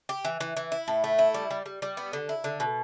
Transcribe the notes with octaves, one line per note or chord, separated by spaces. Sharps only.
G4
E3
E3
E3
E4
A2
A3
E4
G3
G3
G3
G3
B3
D3
E4
D3
B2